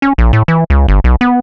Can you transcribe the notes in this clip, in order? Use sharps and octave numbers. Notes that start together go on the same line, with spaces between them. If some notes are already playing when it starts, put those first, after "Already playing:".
C#4
A#1
A2
E3
C#2
G1
B1
B3